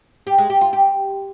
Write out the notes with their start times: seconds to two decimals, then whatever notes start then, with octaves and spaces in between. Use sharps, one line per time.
0.27 G4
0.38 G#3
0.50 G4
0.61 F4
0.73 G4